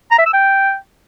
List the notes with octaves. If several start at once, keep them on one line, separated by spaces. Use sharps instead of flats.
A#5
E5
E6
G5